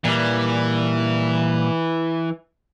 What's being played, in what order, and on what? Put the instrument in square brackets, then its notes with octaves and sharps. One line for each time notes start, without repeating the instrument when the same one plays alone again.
[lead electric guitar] A#2 G3 [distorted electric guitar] E3